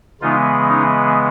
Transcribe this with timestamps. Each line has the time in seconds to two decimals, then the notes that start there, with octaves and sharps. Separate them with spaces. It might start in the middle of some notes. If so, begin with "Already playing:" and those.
0.21 C#3 E3 G#3 B3 D#4 F4
0.68 C#4 D#4